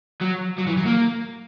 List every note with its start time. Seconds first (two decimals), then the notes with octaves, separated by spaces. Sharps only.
0.21 F#3
0.59 F#3
0.68 E3
0.78 F#3
0.86 A#3